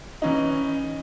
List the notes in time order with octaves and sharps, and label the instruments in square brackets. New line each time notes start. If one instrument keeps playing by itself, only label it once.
[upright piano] E3 C#4 D#4